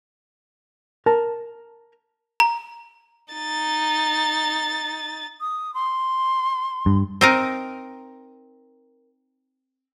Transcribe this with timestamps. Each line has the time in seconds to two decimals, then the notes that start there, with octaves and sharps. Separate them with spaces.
1.06 A#4 A5
2.40 A#5
3.33 D#4 A6
5.41 D#6
5.74 C6
6.86 G2
7.21 C4 D#4 A#4